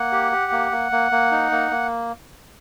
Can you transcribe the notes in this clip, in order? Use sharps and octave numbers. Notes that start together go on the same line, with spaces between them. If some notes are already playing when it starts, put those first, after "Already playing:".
Already playing: A#3 F#5
G4
G4
A#3
A#3
A#3
A#3
D#4
A#3
A#3